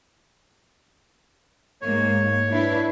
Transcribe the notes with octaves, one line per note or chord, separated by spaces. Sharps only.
G#2 A#3 C#5
D4 E4 B4